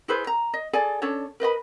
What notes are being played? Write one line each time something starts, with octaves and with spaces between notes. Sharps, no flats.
E4 G#4 B4 C5
A#5
D#5
G#4 A4 D5 G#5
C#4 D4 A4 C#5
A#4 B4 D#5 B5